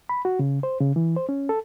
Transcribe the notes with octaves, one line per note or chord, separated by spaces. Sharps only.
B5
F#4
C#3
C5
C#3
E3
C5
C#4
A4